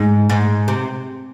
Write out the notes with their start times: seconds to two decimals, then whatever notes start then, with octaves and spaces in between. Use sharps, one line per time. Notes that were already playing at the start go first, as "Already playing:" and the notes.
Already playing: G#2
0.30 G#2
0.68 C3